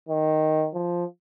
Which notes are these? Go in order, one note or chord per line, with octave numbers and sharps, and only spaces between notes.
D#3
F3